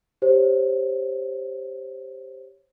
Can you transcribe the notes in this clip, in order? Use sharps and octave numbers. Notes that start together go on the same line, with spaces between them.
G4 C5 C#5